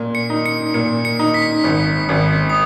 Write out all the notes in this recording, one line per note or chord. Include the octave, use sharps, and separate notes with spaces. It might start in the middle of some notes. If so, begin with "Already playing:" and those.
Already playing: A#2
C#7
D#4
C#7
A#2 C#7
C#7
D#4
B6
G#1
G#1
D#6